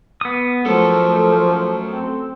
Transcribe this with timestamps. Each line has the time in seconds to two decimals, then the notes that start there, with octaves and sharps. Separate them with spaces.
0.21 B3 D#6
0.66 F#2 F3 F#3 A3 A4
1.89 C4